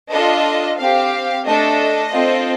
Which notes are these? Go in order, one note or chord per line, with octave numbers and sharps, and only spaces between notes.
D4 F4 A4 D#5
C4 G4 F5
A3 D4 A4 D#5
C4 F4 A4